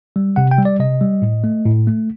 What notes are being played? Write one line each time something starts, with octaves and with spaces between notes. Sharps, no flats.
G3
C3 F#5
G5
G3
D5
C3 D#5
G3
A2
A3
A2
A3